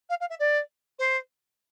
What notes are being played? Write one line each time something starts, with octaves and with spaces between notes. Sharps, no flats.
F5
F5
E5
D5
C5